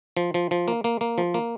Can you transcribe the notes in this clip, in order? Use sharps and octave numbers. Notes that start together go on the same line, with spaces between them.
F3
F3
F3
A#3
A#3
A#3
F3
A#3